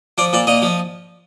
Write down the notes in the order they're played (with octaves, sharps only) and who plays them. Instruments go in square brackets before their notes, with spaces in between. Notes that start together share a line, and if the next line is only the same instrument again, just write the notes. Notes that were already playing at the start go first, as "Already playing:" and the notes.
[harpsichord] F3 D5
A#2 D5
A#2 D#5
F3